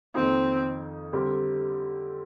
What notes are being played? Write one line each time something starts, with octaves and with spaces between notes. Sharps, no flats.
F2 D#3 A#3 C4 D#4
D3 G3 C4 G4 A#4